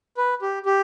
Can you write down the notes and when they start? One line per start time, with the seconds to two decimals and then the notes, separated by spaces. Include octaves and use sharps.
0.17 B4
0.42 G4
0.66 G4